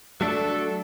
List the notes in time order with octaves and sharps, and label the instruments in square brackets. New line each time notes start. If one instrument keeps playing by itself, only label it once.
[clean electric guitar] F#3 A3 D4 [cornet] A4